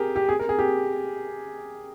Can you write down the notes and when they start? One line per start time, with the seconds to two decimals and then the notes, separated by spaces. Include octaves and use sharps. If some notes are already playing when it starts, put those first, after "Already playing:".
Already playing: G4 G#4 A#4
0.16 G4
0.29 G#4
0.39 A#4
0.49 G#4
0.59 G4